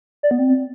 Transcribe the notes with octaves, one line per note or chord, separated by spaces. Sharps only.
D5
B3
C4